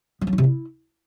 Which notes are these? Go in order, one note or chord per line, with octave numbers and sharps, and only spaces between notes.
F3
F#3
D#4
C3
E4